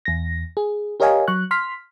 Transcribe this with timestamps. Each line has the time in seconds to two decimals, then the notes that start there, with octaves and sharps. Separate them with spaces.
0.05 E2 A#6
0.57 G#4
1.00 G4 A#4 C#5 D#5 F5 G#5
1.28 F#3 C#6 F#6
1.51 C6 F6 B6